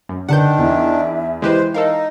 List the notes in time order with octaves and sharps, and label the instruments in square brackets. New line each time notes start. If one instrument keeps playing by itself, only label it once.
[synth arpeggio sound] F#2
[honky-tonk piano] D3 B4 [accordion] D#3 D4 [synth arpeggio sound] F#5 A5 G6
[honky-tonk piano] E2 [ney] E5
[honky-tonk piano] E3 [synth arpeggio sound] G#3 G4 B4 [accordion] C5
[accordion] D#4 [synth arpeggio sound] A4 A#4 F5 [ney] D#5